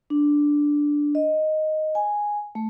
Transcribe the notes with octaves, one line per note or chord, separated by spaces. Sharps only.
D4
D#5
G#5
A3